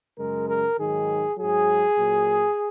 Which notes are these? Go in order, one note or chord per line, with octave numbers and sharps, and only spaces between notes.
F#2 C#3 G#3 A#4
A#4
G#2 D#3 F#3 G#4
G#2 F#3 G#4
A#2 F#3